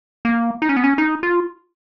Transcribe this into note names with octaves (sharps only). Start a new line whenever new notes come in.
A#3
D#4
C#4
B3
C#4
D#4
F4